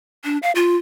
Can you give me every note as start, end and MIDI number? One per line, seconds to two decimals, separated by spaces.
0.24 0.38 62
0.43 0.52 77
0.55 0.77 65